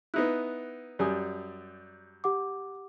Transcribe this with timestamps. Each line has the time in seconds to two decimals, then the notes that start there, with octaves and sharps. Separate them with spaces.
0.14 B3 D#4 E4 F#6
0.99 F#2 G3 D5 G#5 D#6
2.24 G4 F#5 D6